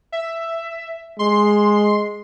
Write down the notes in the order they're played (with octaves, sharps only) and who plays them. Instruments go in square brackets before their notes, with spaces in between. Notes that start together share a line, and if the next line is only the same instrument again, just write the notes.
[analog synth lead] E5
[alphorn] G#3 [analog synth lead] C6